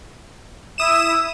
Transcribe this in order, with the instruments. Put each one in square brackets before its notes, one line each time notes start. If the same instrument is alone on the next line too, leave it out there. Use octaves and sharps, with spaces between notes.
[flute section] E4 [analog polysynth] D#6 E7